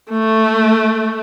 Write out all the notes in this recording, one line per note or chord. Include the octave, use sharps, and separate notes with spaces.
A3